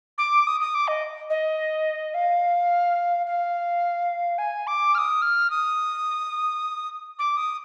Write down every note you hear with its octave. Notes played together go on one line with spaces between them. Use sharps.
D6
D#6
D#6
D6
D#5
D#5
F5
F5
G#5
D6
F6
D#6
F6
D#6
D6
D#6